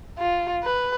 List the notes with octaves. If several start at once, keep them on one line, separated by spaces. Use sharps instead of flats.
F4
B4